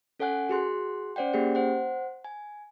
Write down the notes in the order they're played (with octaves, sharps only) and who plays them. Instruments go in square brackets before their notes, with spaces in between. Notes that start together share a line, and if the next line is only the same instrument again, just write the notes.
[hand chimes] C#4 A4 C#5 F#5 G#5 F#6
F#4 G#4 C6 F#6
C#4 C5 D5 F#5 G5
A#3 C#4 G4 G#4 G5
C5 F#5
G#5